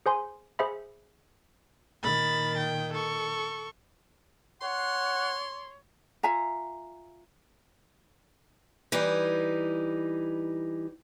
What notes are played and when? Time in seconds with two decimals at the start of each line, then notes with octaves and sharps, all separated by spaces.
0.06 G#4 C5 G#5 C6
0.59 G#4 C5 E5 B5
2.03 A#2 D#3 B5 A6
2.58 G5
2.94 A4 C#6
4.62 C#5 F#5 C6
6.23 F4 E5 G#5 A#5
8.92 E3 G3 D#4